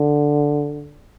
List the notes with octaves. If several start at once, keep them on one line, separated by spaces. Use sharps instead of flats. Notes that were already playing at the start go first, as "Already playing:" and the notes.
Already playing: D3